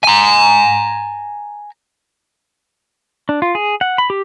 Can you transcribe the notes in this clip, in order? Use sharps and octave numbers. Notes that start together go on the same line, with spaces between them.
G#5 A#5
D4
F4
G#4
F#5
B5
G4